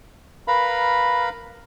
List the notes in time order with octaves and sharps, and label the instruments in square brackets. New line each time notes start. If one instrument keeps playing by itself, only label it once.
[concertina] A#4 B4 F5 A#5 B5